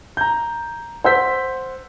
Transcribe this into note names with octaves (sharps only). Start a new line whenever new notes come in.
A#5 G6
C5 F#5 E6 G6 B6